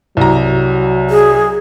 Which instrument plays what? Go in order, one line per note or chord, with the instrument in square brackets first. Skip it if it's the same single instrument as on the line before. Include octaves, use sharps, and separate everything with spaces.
[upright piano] C2 A#5 [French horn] F#3
[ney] G#4